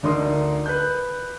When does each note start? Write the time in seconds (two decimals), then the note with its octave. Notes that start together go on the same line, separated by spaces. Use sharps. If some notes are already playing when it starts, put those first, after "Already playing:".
0.03 D2 D4 D#4 A#4 C6 D#6
0.66 B4 F#6 G6